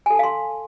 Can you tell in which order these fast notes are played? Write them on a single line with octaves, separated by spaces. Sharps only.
G#5 A4 A5 F5 C6